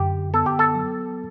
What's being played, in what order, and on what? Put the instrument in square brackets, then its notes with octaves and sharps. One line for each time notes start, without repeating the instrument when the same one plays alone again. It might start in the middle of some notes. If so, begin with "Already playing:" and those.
Already playing: [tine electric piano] F#2 D3 [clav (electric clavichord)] G4
[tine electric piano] B3 [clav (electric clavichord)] A4
[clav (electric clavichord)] G4
A4
[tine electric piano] F#3